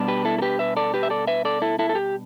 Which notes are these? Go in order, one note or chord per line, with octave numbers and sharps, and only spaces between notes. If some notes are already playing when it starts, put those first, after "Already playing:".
Already playing: B2 G3 B3 D4
G4 B4
E4 A4
A4
G4 B4
B4 E5
A4 D5
G4 B4
E5
A4 D5
B4 E5
A4 D5
E4 A4
E4 A4
A4
G4